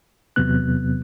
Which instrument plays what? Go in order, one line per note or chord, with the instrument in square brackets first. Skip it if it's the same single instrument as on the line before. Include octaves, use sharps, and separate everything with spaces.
[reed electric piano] E2 C3 F#3 B3 F#6